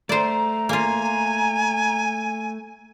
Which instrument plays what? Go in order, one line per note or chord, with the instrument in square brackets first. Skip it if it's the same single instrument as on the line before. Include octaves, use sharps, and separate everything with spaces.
[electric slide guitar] A3 [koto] C5 D5 [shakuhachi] A#5
[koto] A#3 F4 [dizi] G#5